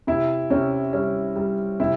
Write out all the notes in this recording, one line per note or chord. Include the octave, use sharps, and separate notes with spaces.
C3 E4
C3 C#4
G3 C#4
G3
C3 E4